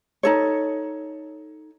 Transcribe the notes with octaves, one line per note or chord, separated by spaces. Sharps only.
D#4 A4 C#5